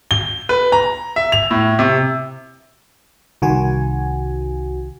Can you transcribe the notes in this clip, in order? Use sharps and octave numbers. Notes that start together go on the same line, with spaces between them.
G7
B4
A#5
E5
F7
A2
C3
C2 D#3 F#4 G#5